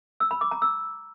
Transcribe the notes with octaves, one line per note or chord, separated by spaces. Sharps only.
E6
B5
D6
A#5
E6